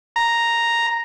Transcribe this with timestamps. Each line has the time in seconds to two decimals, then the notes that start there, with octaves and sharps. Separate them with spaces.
0.16 A#5